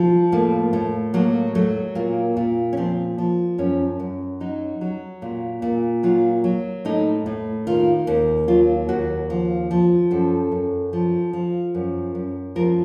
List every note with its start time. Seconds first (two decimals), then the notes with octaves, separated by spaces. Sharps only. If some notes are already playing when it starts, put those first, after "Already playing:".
Already playing: F3
0.32 A2 A#3
0.73 A2
1.14 F#3 A#3
1.55 F#3 A3
1.95 A#2 A#3
2.37 A#2
2.73 C#4
2.77 F3 C4
3.18 F3
3.58 F#2 C#4
4.00 F#2
4.40 F#3 D#4
4.81 F#3
5.22 A#2
5.62 A#2
6.03 F#3 F4
6.44 F#3
6.85 A2 D#4
7.26 A2
7.67 D#3 F4
8.07 D#2
8.48 F#3 F4
8.89 D#2 F#4
9.30 F3
9.71 F3
10.11 F#2 A4
10.52 F#2
10.93 F3
11.33 F3
11.75 F#2
12.15 F#2
12.56 F3 A#4